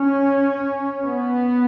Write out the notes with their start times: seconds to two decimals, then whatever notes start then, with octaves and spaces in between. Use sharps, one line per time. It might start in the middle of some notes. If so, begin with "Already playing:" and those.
Already playing: C#4
1.05 B3